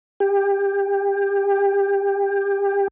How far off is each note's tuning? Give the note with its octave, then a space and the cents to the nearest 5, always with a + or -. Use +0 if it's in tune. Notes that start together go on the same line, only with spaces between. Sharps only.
G4 +25